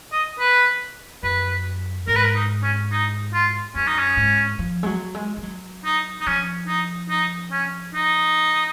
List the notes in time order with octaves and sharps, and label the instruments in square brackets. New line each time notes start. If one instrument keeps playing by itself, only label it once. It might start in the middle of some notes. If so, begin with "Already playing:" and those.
[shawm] D#5
B4
[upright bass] F#2 [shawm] B4
[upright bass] G#2 [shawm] A#4
[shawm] B4
A#4
D#4
C#4
D#4
F4
[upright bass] F#2 [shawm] C#4
[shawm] D#4
C#4
[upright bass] G#2
F3
G#3
F#3
G#3
G#3
F#3
[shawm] D#4
D#4
[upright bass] F3 [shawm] C#4
[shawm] D#4
D#4
C#4
D#4